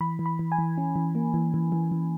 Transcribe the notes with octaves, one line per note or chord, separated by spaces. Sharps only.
E3 B5
E3
B5
E3
G#5
E3
C#4
E3
A#3
E3
E3
E3
E3